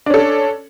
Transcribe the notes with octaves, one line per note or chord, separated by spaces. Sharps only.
C#4 D4 A4